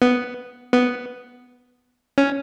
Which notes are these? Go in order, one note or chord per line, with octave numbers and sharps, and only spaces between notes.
B3
B3
C#4